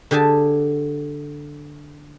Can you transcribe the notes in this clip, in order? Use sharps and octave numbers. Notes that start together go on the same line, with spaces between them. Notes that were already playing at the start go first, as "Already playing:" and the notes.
D3 G4 G#4 G#5 A5